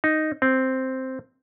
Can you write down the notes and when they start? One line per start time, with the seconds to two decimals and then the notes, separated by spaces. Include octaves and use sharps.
0.04 D#4
0.42 C4